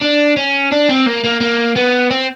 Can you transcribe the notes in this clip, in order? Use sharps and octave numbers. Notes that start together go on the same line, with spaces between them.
D4
C#4
D4
C4
A#3
A#3
A#3
B3
C4